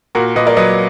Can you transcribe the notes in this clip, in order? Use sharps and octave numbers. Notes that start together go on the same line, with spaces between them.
A#2 F#4 A#4
A#2 B4 D#5
A#4 D5
F#3 B4 D#5